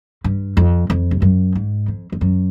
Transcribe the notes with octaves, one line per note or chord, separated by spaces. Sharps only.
G2
F2
F2
G2
F#2
G#2
F2
F2
F#2